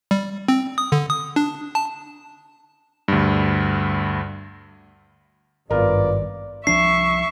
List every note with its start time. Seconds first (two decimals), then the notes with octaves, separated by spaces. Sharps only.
0.11 G3
0.48 C4
0.78 D#6
0.92 D3
1.10 D#6
1.36 D4
1.75 A5
3.08 D2 G2
5.71 G#1 G2 B3 F4 A#4 D5
6.67 C2 F3 D4 E5 C#6 C7